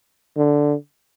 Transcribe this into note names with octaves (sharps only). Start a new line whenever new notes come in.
D3